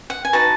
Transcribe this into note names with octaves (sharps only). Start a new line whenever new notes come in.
F#5
G#5
D#4 F#4 B4 A5